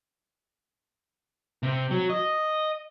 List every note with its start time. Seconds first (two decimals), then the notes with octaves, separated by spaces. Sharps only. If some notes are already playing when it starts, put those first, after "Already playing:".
1.63 C3
1.91 F#3
2.10 D#5